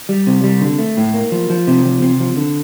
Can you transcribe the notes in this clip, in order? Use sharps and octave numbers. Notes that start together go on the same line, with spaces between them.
G3
C3
G3
D3
A3
A2
A#3
F3
F3
C3
F3
C3
F3
D3